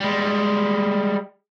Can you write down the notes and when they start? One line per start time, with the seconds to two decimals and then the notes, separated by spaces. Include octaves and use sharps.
0.01 G3 G#3